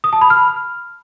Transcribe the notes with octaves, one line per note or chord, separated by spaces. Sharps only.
D#6
A5
B5
F6